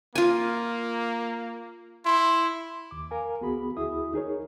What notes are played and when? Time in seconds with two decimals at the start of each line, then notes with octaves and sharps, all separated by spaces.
0.15 A#3 F4 G#5
2.05 E4 C6
2.91 D#2 D6
3.11 A#4 F5 G#5
3.41 C#2 B3 F#4 G#4 B5
3.77 D2 E4 F#4 G#4 E5 D#6
4.14 D#4 G#4 A#4 C#5